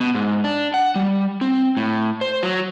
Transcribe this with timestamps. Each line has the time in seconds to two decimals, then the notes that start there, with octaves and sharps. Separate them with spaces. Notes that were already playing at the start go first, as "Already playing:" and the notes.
0.01 B2
0.15 G#2
0.44 D4
0.74 F#5
0.95 G3
1.41 C4
1.77 A2
2.21 C5
2.43 F#3